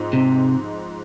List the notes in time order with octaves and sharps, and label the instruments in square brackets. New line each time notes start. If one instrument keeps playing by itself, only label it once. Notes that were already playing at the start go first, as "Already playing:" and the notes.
Already playing: [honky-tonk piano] G#2 F3 C4 D#4
[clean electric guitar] C3